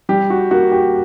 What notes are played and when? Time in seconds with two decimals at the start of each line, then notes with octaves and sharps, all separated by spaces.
0.09 G3 G4
0.30 F#4
0.51 A#3 F#4
0.72 G4